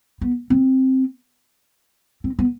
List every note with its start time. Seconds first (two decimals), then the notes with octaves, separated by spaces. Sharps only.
0.21 B3
0.50 C4
2.24 C4
2.39 B3